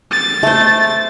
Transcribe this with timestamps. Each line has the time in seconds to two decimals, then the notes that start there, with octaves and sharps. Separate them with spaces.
0.12 A6
0.43 A3 C5